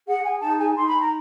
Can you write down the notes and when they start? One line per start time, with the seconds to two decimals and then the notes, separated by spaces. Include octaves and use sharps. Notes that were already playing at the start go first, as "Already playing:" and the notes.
0.07 G#4 F#5
0.24 G#5
0.41 D#4 A5
0.58 G#5
0.75 D#4 C6
0.87 B5
0.99 A#5